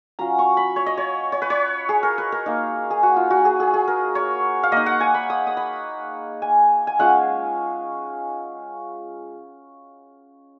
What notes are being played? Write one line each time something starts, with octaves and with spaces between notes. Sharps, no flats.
F#3 C#4 F4 A#5
C#6
B5
C#5
D#5
C#5
C#5
B4
C#5
G#4
A#4
B4
A#4
A#3 D#4
G#4
F#4
F4
F#4
G#4
G#4
G#4
A#4
C#5
F5
A#3 D#4 D#5
F#5
G#5
B5
D#6
D#6
B5
G#5
G#5
G#3 C#4 F4 F#5